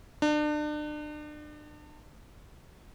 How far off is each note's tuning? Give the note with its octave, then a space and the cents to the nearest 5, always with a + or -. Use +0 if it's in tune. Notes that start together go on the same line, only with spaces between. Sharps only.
D4 +35